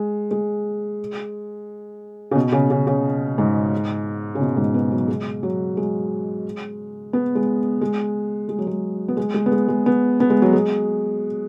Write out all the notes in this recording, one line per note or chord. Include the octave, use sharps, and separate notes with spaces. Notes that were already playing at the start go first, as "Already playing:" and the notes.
Already playing: G#3
G#3
C#3
B2
C#3
C#3
C#3
G#2
C#3
B2
G#2
B3
F#3
G#3
F#3
G#3
B3
G#3
G#3
G#3
F#3
G#3
B3
G#3
G#3
B3
G#3
G#3
B3
B3
G#3
F#3
G#3